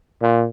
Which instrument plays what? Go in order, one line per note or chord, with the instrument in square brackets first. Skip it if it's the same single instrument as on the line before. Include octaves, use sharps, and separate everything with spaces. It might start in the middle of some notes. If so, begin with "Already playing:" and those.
[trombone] A#2